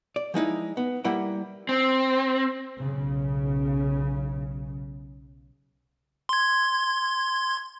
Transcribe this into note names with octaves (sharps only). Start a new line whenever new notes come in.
D5
F3 G#3 D#4 E4
B3
G3 A#3 E4 F#5 G5
C4
B1 C#3
C6 G#6